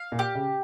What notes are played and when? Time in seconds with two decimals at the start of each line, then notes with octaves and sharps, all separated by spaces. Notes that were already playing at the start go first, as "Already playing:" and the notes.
Already playing: F5
0.12 A#2
0.19 G4
0.35 C#3